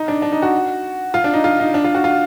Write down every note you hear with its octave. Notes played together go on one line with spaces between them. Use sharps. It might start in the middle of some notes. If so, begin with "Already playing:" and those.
Already playing: D#4
D4
D4
D#4
F#4
F4
D4
D#4
F4
D#4
D4
F4
F#4
F4